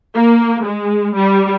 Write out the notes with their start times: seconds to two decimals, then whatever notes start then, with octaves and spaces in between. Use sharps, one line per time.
0.13 A#3
0.63 G#3
1.14 G3